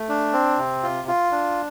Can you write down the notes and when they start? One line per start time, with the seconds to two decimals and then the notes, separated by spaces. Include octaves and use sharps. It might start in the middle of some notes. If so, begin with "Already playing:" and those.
Already playing: A3
0.09 D4
0.33 C4
0.57 C3
0.83 F4
1.08 F4
1.32 D4